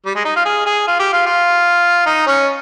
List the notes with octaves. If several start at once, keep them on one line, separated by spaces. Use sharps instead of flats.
G3
G#3
D#4
F4
G#4
G#4
F4
G4
F4
F4
D#4
C#4